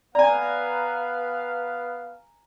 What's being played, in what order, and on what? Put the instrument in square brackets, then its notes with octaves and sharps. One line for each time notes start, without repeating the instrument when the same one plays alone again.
[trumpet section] B3 B4 F5 [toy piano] D5 [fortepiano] G#5 A#5